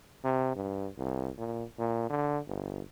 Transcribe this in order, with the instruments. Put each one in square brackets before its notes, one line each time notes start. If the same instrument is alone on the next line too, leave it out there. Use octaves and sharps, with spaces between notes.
[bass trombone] C3
G2
C2
A#2
A#2
D3
G1